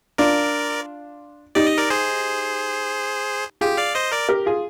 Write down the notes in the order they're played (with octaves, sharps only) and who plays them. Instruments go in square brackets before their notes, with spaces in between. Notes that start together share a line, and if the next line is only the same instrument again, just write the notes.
[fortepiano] D4 F4 [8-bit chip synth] A#4 D5
[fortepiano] D#4 G4 [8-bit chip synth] D5
[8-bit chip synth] D#5
A#4 D5
G#4 C5
[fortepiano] F4 G#4 [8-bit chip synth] G4
[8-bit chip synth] D5 F5
C5 D#5
A#4 D5
[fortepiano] G4 A#4
F4 G#4